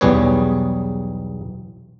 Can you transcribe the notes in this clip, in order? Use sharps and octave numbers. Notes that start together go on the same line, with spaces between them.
B1 E2 G3 G#4 B4 C#5